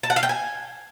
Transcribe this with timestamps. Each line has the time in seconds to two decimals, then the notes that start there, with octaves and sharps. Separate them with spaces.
0.03 A5
0.10 F#5
0.16 F5
0.23 G5
0.29 G#5